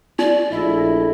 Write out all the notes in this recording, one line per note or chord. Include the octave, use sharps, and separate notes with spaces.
D#4 D5
A#1 A3 E4 D#5